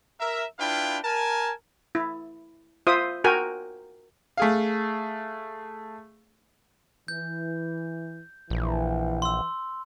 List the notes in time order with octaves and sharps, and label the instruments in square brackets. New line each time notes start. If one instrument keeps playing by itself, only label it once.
[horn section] A#4 E5
D4 E4 F4 B4 F5 G5
A#4 G#5 A5
[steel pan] E4
F4 C5 E5 D#6
F#4 A#4 G5 G#5
[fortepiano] A3 G#4 F5
[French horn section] E3 [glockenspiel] G6
[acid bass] A#1 [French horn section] E3
[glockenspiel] C6 E6